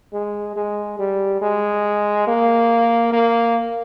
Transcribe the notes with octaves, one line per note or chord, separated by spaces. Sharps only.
G#3
G#3
G3
G#3
A#3
A#3